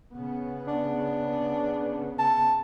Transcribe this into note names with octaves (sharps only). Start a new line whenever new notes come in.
C#3 B3
D4
A5